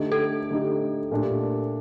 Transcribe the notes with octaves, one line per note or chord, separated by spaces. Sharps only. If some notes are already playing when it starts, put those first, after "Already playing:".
Already playing: D3 A3 D#4 G4
A4
D3 A3 D#4 G4
A#2 A3 D4 G4